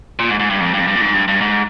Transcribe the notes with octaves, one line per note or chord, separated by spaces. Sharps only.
A#2
G#2
G#2
G2
F2
G2
F2
G2
A#2
G#2
G2
G2
G#2